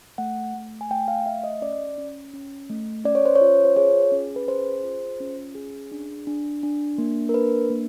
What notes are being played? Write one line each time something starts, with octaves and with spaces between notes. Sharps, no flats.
A3 F#5
A3
G#5
A3 G5
F5
A3 E5
D#5
C#4 D5
C#4
C#4
A3
C#4 D5
C#5
C5
C#5
F4
C5
G#4 C#5
C#4
B4
G#4 C5
F4
C#4
G#4
D4
D4
D4
A#3
A#4
D4 B4
A#3